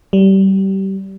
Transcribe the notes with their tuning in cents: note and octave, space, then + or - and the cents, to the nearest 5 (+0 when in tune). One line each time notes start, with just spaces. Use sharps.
G3 -25